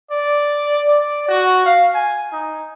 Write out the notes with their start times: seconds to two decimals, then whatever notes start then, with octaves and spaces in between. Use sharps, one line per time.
0.11 D5
0.88 D5
1.28 F#4
1.66 F5
1.95 G#5
2.32 D#4